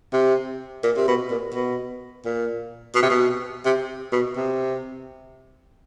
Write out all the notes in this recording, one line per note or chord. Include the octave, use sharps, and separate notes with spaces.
C3
A#2
C3
B2
A#2
B2
A#2
B2
C3
B2
C3
B2
C3